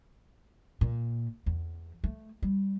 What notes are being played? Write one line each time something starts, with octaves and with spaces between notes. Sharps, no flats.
A#2
E2
A3
G3